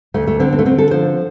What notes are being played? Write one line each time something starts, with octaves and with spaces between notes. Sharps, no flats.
D2 A3
A3
D3 C4
C4
A3
D3 C4
A4
F3 C5